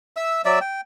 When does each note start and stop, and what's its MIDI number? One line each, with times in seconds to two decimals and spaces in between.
0.16 0.42 76
0.16 0.42 88
0.45 0.59 54
0.45 0.59 74
0.45 0.59 76
0.45 0.59 88
0.61 0.81 79